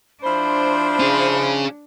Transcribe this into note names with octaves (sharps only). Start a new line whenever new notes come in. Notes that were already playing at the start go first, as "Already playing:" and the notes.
F3 D4 E4 C5 B5
C#4 G#4